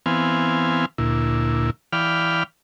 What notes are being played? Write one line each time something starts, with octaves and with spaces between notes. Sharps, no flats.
E3 B3 C4 F5 G#5
D2 A#2 E4
E3 D5 F5 G5 B5 F6